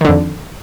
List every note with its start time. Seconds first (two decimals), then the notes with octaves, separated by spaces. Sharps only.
0.01 D#3
0.05 D3
0.09 F2